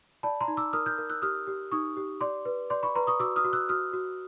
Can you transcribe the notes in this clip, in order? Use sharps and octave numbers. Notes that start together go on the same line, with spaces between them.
D5 A5 B5
A#5 C6
D#4
D6 E6
A#4 D#6 F6
F6 G6
A#4
E6 F#6
G4 D#6 F6
G4
D#4 C#6 D#6
G4
D5 C6 D6
B4
D5 C6 D6
B5 C#6
B4 A#5 C6
C#6 D#6
F#4 D6 E6
D#6 F6
F#4
E6 F#6
F#4 D#6 F6
F#4